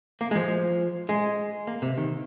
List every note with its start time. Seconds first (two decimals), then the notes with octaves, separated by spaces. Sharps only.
0.21 A#3
0.31 G#3
0.35 F3
1.09 G#3
1.67 A#3
1.82 C3
1.97 D#3